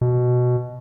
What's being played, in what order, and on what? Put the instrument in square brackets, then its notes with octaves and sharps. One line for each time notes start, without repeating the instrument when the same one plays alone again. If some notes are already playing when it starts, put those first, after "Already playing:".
[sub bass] B2